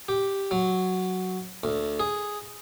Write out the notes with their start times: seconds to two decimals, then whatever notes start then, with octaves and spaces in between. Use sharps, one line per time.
0.09 G4
0.51 F#3
1.64 D2
2.00 G#4